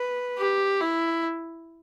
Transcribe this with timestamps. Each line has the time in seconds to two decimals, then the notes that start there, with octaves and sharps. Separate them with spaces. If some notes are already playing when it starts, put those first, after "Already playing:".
Already playing: B4
0.38 G4
0.81 E4